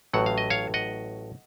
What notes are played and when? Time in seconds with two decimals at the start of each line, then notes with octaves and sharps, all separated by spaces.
0.13 A1 A2 F#3 F#5
0.26 F5
0.38 D#5
0.50 C#5 F5
0.74 D#5 F#5